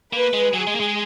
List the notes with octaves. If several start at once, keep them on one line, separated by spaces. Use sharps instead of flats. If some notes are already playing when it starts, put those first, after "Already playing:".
A#3 B4
G#3
F#3 G#4
G#3
A#3
G#3